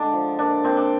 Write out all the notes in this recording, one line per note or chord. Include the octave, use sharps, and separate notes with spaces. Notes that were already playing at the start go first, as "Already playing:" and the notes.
Already playing: D3 G#3 D4
F3
A#2 D4
A#2 C4
D4